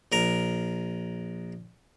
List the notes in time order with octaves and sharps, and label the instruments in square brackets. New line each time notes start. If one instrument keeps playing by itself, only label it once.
[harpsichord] A#1 A#4